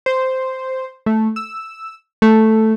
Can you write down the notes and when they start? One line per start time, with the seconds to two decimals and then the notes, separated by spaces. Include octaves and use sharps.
0.06 C5
1.06 A3
1.36 E6
2.22 A3